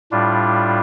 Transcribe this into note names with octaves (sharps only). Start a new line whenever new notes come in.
A2 G3 D4 F4